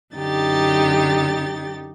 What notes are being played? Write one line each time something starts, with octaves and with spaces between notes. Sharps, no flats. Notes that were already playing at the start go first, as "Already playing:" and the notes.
F#2 D3 D#4 G4 A6